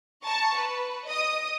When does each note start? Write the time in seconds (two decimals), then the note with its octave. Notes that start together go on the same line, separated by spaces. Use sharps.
0.24 A5 A#5 C#6
0.57 B4
1.07 D#5 D#6